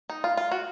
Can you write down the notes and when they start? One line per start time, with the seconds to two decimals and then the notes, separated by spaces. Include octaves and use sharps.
0.10 D#4
0.24 F4
0.37 F4
0.52 F#4